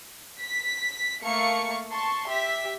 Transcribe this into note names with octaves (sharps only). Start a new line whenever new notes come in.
B6
A3 A#3 F5 C#6 C#7
A5 C6 C#6
G4 E5 B6